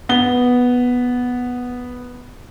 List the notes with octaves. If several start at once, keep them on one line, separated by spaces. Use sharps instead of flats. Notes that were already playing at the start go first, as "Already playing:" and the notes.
B3 G7